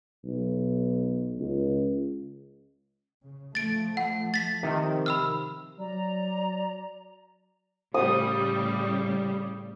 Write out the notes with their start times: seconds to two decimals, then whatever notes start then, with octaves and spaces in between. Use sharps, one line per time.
0.24 B1
1.38 C#2
3.22 C#3
3.55 F3 A3 A6 D7
3.97 F#5
4.34 A6 B6
4.63 C3 D#3 F3
5.06 B5 E6 F6
5.79 F#3 D5 A#5
7.94 A2 C#3 G3 D#6